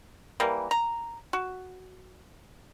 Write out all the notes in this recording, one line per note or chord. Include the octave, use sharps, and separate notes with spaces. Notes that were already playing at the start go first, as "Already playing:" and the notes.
E3 G3 A#3
A#5
F#4